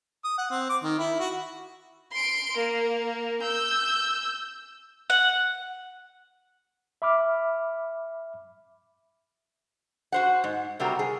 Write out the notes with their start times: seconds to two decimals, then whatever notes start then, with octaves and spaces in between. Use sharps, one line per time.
0.24 D#6
0.38 F#5
0.51 C4
0.69 D6
0.83 D#3
0.99 E4
1.20 F#4
2.12 C6 D7
2.57 A#3 A#4
3.42 E6 G6
5.10 F#5
7.02 E5 B5 D6 F6
10.12 F#4 C5 F#5
10.44 G#2
10.79 C3 G3 C4 F#4 A#4
10.99 G#4